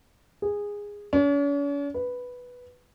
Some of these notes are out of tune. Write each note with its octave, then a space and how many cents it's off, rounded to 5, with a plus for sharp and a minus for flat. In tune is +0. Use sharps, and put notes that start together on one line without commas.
G#4 -15
C#4 +45
B4 +0